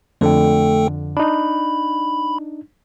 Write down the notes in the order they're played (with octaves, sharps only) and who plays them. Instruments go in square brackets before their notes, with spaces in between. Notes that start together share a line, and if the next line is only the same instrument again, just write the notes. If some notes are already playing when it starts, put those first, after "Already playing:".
[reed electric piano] F2 D3 [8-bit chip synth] A3 A4 G5
[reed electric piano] D4 D#4 [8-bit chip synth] B5